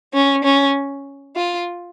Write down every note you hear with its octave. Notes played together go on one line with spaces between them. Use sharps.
C#4
C#4
F4